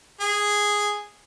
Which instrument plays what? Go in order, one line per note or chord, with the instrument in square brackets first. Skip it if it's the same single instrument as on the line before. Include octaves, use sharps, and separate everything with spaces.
[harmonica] G#4